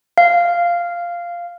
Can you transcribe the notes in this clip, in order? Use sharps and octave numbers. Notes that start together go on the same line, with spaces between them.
F5